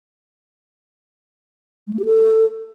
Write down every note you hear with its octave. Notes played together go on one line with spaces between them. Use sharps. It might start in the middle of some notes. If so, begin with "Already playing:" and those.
G#3
A3
G4
A4